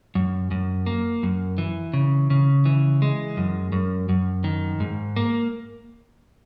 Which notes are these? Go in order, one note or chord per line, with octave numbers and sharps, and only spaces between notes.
F#2
F#2
A#3
F#2
E3
C#3
C#3
E3
G#3
F#2
F#2
F#2
D#3
G#2
A#3